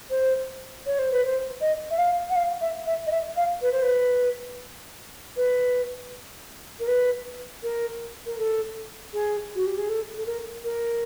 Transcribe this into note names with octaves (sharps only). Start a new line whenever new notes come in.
C5
C#5
C5
B4
C5
D#5
E5
F5
F#5
F5
E5
E5
D#5
E5
F5
B4
C5
B4
B4
A#4
B4
A#4
A#4
A4
G#4
F#4
G4
G#4
A4
A4
A#4
A#4